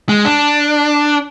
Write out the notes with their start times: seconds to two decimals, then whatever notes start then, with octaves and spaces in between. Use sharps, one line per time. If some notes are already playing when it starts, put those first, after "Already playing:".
0.09 G#3
0.25 D4